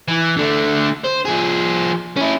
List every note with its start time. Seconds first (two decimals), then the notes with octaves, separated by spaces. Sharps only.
0.08 E3
0.37 D3 A3
1.04 C5
1.25 F3 G#4
2.17 C#4 E4